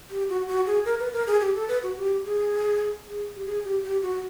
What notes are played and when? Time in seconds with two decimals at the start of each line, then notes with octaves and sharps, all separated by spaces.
0.10 G4
0.29 F#4
0.48 F#4
0.66 G#4
0.85 A#4
1.00 B4
1.13 A#4
1.27 G#4
1.41 G4
1.55 A4
1.69 B4
1.83 F#4
1.97 G4
2.25 G#4
3.09 G#4
3.36 G4
3.46 G#4
3.65 G4
3.84 G4
4.02 F#4